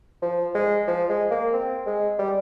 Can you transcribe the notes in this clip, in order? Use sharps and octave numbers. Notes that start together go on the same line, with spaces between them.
F3
G#3
F3
G#3
A#3
C4
G#3
G3